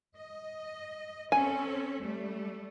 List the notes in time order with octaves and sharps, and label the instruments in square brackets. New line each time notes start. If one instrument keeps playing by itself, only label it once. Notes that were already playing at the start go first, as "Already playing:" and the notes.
[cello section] D#5
[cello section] C4 C#4 A4 [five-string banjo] G#5
[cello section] G3 A3